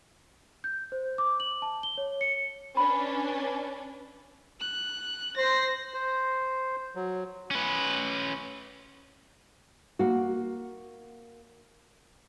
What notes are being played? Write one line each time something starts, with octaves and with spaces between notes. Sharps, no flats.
G6
C5
D6
F#7
A5
G7
C#5
C#7
C#4 D4 B4 B5
F#6
C5 A#6 C7
C5
F#3
C#4 B4
A#3 F#4